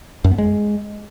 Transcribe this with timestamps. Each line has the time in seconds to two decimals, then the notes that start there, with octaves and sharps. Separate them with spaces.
0.24 F#2
0.31 B3
0.38 G#3